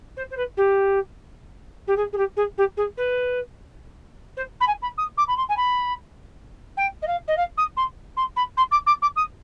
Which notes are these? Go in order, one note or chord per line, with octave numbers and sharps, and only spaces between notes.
C5
C5
B4
G4
G4
G#4
G#4
G4
G#4
G4
G#4
B4
C5
B5
G#5
B5
D#6
D6
B5
C6
G#5
B5
G5
D#5
F5
D#5
F5
D#6
C6
C6
B5
C6
D6
D6
D6
D#6